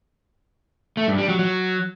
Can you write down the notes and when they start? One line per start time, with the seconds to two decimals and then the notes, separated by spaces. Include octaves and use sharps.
0.97 A3
1.08 G2
1.18 G3
1.29 F#3
1.39 F#3